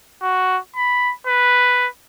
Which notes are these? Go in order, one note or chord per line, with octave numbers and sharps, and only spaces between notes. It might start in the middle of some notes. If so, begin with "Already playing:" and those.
F#4
B5
B4